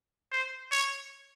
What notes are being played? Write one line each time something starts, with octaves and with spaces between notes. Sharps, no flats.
C5
C#5